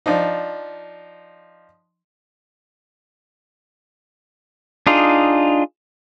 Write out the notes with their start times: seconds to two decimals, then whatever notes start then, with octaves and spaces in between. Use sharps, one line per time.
0.06 F3 D4 D#4
4.87 D4 D#4 F4 G#4